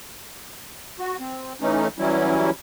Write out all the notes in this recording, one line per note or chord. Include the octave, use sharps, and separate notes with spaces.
F#4
C4
E3 A3 C#4 D#4
E3 F#3 G3 C#4 E4